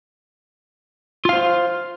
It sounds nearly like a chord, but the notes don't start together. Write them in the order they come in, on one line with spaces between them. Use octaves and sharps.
F4 F5 C5